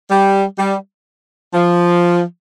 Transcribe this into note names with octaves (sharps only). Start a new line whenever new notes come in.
G3
G3
F3